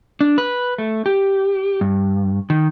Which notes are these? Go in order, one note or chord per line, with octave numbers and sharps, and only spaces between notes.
D4
B4
A3
G4
G2
D#3